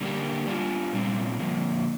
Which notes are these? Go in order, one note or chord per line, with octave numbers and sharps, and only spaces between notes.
D3 G3 A#3 D4 G4
G3 D4 F4
A#2 G3 C4
D3 F3 A#3